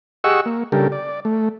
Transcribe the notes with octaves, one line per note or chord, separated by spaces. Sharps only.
G4 G#4 D#5 F#5 C#6 E6
A#3
C#3 G3 D4 G4 A4 A#4
D5
A3